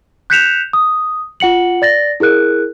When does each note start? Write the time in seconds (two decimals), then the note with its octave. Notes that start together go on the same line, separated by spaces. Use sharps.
0.30 F#6 G6 B6 C#7 E7 F7
0.73 D#6
1.40 F4 F#5 C#7 F#7
1.82 D5 A6 A#6
2.20 E4 G#4 A#4 F#6